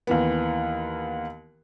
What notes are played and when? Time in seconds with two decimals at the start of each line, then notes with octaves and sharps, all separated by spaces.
0.07 D#2 E3 B3